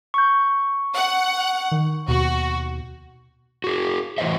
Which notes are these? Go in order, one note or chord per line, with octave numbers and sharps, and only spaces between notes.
C#6 G6
F#5
D#3
D#2 B2 F#4
F#4 G#4
A2 E3 F#3 C5 D#5 E5